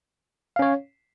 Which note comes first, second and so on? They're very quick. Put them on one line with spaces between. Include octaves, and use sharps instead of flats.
F5 C#4 C#5